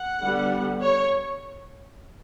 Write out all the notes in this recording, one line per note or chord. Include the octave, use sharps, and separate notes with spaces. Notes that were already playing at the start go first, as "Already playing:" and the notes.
Already playing: F#5
D3 G3 B3
C#5